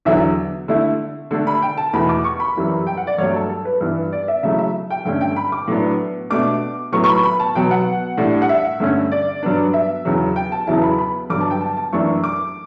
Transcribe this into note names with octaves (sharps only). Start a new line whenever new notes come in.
E2 D3 F#3 E5
D3 A3 E4
D3 A3 D4
B5
G5
A5
E2 B2 A3 B5
D6
C#6
B5
F#2 E3 G3
G5
F#5
D5
G2 F#3 A3 C#5
A4
A4
B4
G2 E3 B3
D5
E5
C#3 F#3 A3 E4 E5
E5
G5
G2 D3 A3 C#4 G5
G5
B5
D6
A2 F#3 B3 D4
B2 A3 D4 D6
A2 F#3 B3 C#6
C#6
B5
B5
A5
B2 F#3 B3 G5
F#5
A2 G3 D4
F#5
E5
G2 D3 A3 C#4
D5
G2 F#3 B3 D4
E5
E2 C#3 F#3
G5
A5
E2 C#3 F#3 B3 E4 A5
B5
B5
G2 D3 F#3 B3 D6
A5
G5
A5
A5
F#2 E3 A3 D4 C#6
D6